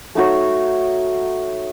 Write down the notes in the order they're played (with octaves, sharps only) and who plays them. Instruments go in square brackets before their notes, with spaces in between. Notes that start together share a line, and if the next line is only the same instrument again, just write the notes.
[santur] A3 D#4 F#4 C#5